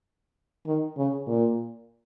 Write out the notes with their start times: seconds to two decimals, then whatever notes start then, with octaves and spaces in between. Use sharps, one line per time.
0.66 D#3
0.97 C#3
1.27 A#2